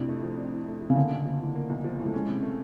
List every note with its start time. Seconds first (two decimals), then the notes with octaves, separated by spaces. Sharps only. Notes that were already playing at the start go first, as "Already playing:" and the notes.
Already playing: F2 A2 C3 D4
0.08 A3
0.23 F3
0.38 D4
0.52 A2
0.67 A3
0.82 F3
0.90 C#3
0.96 D3 A#3
1.11 B1
1.25 F3
1.41 A2
1.55 A#3
1.70 B1
1.84 F3
1.99 A2
2.06 A3
2.14 G#3 C#4
2.29 C3
2.43 A3